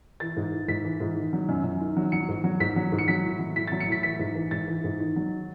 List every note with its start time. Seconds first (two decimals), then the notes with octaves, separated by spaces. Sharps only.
0.20 E3 A6
0.37 G#2
0.52 E3
0.68 G#2 B6
0.84 E3
1.00 G#2
1.16 D#3
1.33 F#3
1.49 F#2
1.64 F#2
1.80 D#3
1.97 F#3
2.12 F#3 C#7
2.29 G#2
2.44 F#3
2.60 G#2 B6
2.76 F#3
2.92 G#2
2.99 C#7
3.08 F#3 B6
3.24 A2
3.39 F#3
3.56 A2 B6
3.68 A6
3.72 F#3
3.80 C#7
3.88 A2 B6
4.03 E3 B6
4.19 G#2
4.35 E3
4.51 G#2 A6
4.68 E3
4.84 G#2
5.00 D#3
5.16 F#3